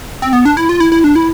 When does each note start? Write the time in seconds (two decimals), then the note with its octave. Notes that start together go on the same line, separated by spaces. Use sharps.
0.22 C4
0.33 B3
0.45 D4
0.57 E4
0.69 F4
0.80 E4
0.92 E4
1.04 D4
1.16 E4